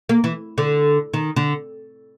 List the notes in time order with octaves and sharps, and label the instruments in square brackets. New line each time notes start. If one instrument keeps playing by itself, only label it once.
[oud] A#3
E3
D3
D#3
D3